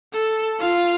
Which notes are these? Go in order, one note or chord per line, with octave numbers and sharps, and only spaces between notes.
A4
F4 F5